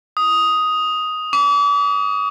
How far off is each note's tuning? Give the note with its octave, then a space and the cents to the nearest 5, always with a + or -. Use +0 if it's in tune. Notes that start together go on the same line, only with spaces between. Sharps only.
D#6 +5
D6 -40